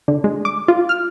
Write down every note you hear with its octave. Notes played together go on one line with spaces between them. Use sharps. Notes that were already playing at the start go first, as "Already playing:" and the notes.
D3
G#3
D6
F4
F6